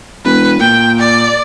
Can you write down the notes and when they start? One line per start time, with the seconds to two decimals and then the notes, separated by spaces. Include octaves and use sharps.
0.25 E1 B4
0.60 A#2 G5
0.99 D5